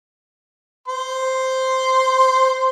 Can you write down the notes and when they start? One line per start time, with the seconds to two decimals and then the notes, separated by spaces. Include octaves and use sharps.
0.88 C5 C6